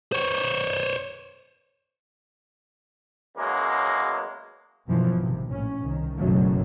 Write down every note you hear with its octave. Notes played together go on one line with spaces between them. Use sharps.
C5 C#5
E2 F#3 G#3 A#3 C#4
F#2 B2 E3 F3
G#1 C3
A#1 A2 C#4
C2 D#3
F#1 B1 F#2 B2 F#3 A3